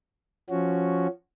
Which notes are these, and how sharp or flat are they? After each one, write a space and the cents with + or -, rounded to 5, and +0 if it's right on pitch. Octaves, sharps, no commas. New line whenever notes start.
F3 +0 C#4 +0 F#4 +0